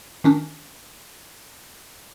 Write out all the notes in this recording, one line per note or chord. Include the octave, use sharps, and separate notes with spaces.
D#3 C#4 D4